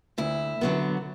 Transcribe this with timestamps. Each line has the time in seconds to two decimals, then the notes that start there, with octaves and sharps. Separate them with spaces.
0.18 D2 E4
0.61 D3 F#3 B3